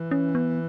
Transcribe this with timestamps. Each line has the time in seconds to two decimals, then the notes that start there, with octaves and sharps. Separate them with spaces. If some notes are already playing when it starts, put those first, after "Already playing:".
Already playing: E3
0.11 C#4
0.35 B3